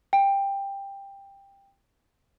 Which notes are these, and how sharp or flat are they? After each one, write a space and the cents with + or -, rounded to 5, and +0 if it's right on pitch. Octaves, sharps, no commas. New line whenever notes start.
G5 +15